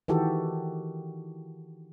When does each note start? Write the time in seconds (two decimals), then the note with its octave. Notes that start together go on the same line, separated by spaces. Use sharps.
0.08 D#3 E3 F#4 G4 A4